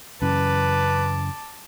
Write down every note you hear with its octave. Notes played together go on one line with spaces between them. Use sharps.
F#2 C#3 E3 B4 A5 D6